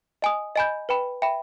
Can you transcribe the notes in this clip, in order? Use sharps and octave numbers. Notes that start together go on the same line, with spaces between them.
D#5 G#5 D#6
D#5 G#5 B5 G6
B4 G5 B5
E5 G5 B5